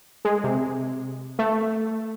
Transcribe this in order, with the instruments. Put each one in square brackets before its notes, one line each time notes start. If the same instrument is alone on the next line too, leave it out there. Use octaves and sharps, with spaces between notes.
[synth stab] G#3
C3
A3